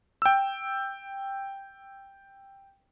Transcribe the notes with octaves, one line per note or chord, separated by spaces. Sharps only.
G5 E6